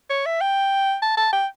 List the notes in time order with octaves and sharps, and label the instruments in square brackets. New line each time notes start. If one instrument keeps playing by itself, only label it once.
[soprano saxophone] C#5
E5
G5
A5
A5
G5